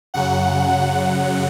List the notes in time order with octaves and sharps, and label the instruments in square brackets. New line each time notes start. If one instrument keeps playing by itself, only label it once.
[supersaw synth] F#2 C#3 F#3 F#5